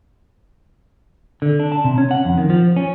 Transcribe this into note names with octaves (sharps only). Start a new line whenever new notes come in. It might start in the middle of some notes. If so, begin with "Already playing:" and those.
D3
D4
A5
C3
C#4
F#5
F2
D#3
F3
C#4